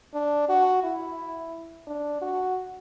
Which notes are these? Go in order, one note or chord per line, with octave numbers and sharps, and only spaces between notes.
D4
F#4
E4
D4
F#4